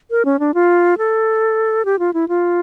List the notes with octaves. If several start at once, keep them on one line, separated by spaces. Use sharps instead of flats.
A#4
C#4
D4
F4
A4
G4
F4
E4
F4